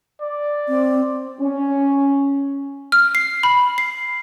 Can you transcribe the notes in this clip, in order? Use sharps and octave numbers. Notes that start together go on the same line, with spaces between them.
D5
C4
C#4
F6
C7
B5
C7